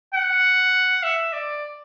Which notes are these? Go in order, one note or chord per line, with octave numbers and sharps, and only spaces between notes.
F#5
E5
D5